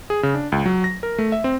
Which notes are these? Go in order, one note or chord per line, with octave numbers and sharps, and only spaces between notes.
G#4
C#3
D4
C#2
F#3
A#6
A#4
A3
E5
C4